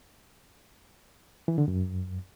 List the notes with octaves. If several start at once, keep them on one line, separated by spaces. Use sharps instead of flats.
E3
D3
F#2